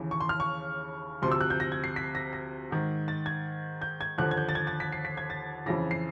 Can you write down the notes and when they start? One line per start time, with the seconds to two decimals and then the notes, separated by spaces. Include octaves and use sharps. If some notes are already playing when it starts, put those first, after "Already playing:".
Already playing: D#2 C#3 E3
0.11 C#6
0.21 C6
0.29 F6
0.40 C#6
1.22 D2 C3 F3 C6
1.32 E6
1.41 F#6
1.50 G6
1.60 A#6
1.72 G#6
1.84 C7
1.96 B6
2.15 A#6
2.33 A#6
2.71 G#2 D#3
3.08 A6
3.26 G#6
3.82 G6
4.01 G#6
4.18 D#2 D3 F3 F#6
4.31 G#6
4.37 G6
4.49 A6
4.55 G#6
4.67 A6
4.80 B6
4.92 C7
5.05 B6
5.17 G#6
5.30 A6
5.66 F2 C#3 E3 A#6
5.91 C7